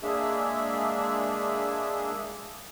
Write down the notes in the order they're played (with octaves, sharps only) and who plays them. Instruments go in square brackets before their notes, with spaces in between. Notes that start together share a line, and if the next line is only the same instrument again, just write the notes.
[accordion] G#3 A#3 D4 G#4 E5